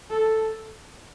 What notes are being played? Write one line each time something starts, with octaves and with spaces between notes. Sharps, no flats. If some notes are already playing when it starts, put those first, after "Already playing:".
A4